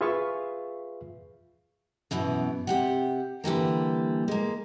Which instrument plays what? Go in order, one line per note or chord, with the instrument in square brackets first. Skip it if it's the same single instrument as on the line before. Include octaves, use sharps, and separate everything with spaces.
[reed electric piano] F4 G#4 B4 E5 F5 C#6
[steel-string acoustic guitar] F#2 B2 E3
C3 G4 F#5
D3 E3 G3 A#3
G#3 A#3